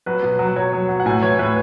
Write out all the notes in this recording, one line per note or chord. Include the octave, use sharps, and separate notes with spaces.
F#3 B4
B2
F#3
F#3 C#5
F#3
F#3
F#5
A2 G#5
E3 C#5
A2 B4